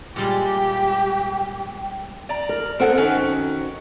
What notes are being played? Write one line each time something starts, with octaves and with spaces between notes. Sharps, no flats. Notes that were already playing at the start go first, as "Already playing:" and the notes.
A#2 G3 G#3 G4 G5
D5 A#5
A#4
B3 C4 A4 A#4 F#5
D#3 C#4 F#4